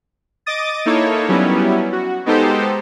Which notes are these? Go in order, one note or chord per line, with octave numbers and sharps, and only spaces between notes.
D#5 D6 D#6 A6
A#3 D#4 E4 A4 C#5
F#3 G3 B3 C#4 E4
F#4
G#3 B3 D#4 G4 A4 C5